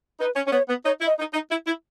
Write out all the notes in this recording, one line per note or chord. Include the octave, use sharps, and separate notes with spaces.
D#4 B4
C#4
C#4
B3 C#5
B3
D#4 C#5
E4
D#5
D#4
D#4
E4
E4